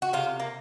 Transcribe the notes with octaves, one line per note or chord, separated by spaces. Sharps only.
F#4
C3 F4
A#3